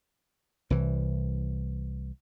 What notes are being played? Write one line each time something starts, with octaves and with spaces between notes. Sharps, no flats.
C2 E3